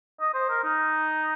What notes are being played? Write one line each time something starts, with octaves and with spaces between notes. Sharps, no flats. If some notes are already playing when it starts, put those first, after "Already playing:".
D#5
C5
A#4
D#4